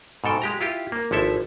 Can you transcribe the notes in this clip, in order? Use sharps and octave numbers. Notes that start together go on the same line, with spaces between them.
G#2 B2 A4 G5
G#3 G4 A#5
E4 F4 G4
A#3
G#1 F3 E4 A4 E5